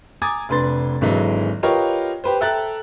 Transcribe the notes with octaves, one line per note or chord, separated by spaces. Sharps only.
G#5 A#5 D6 D#6 G#6 A6
F1 D4 B4 C6 A6
G#1 D3 E3 F#3 G#3
F4 G4 A#4 B4 C#5 D#5
G4 B4 C5
A4 E5 G5 A#5 F#6 A6